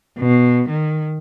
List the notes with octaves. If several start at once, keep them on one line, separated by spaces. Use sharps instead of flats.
B2
D#3